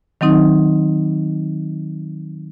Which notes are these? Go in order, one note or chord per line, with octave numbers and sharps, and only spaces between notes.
D#3 F#3 C4 D#4